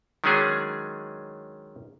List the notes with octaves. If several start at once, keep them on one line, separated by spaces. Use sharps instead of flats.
D#3 F#3 G#3 C#4 D4 G#4